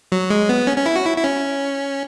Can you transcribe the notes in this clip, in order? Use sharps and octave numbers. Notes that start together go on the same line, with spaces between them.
F#3
G#3
B3
C#4
C#4
E4
F#4
E4
E4
C#4